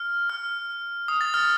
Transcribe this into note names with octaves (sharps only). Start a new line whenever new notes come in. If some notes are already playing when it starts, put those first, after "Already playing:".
Already playing: F6
F6
D#6
A6
F6